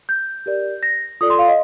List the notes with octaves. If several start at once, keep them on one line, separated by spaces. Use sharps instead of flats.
G6
G4 A#4 D5
A#6
F4 A4 D5 D#6
C6
F5
D#5